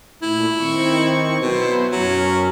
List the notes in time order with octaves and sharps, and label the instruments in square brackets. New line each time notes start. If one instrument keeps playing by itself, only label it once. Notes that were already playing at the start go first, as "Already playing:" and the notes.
[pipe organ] A#2 A3 [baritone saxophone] E4
[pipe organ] D#3 C4 C#6
[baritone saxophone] B2 [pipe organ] F#3 E4 C5
[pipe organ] F#2 C#4 [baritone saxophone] F#3